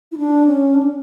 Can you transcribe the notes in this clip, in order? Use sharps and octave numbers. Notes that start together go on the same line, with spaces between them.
E4
D4
C#4
D4
C#4